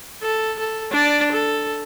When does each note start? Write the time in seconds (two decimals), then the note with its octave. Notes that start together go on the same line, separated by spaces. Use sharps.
0.22 A4
0.59 A4
0.91 D4 D5
1.32 A4